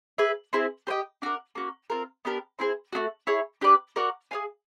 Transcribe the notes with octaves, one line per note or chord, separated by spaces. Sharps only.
G#4 B4 E5
C4 E4 G#4 C5
G4 C5 D#5 G5
D4 F#4 A#4
A#3 C#4 F#4
C4 F4 A#4
B3 D4 G4 A#4
C4 E4 G#4 C5
A3 D4 F#4
E4 G#4 C#5
D4 G4 B4 D5
F#4 A#4 D5 F#5
G#4 C#5 F5 G#5